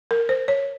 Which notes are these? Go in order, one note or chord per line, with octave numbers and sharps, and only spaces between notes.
A#4
C5
C#5